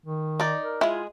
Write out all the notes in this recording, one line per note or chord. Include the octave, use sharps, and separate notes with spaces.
D#3
D#4 D5
A#4
G#3 E4 F4 G#4